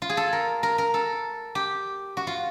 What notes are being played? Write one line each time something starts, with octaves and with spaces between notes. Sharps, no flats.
F4
G#4
A4
A#4
A#4
A#4
A4
G4
F#4
F4